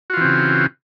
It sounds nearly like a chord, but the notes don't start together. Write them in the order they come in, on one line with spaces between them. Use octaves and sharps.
F#4 F4 E3 C4 C#3